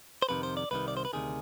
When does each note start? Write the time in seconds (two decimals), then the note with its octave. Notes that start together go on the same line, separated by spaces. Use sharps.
0.22 C5
0.29 F2 C3 D#3 B4
0.43 C5
0.57 D5
0.71 C2 C3 D#3 B4
0.88 D5
0.97 C5
1.05 B4
1.13 D2 C3 D#3 G#4